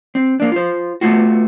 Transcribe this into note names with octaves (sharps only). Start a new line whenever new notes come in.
C4
A#3 D4
F4 C5
A3 B3 F4 F#4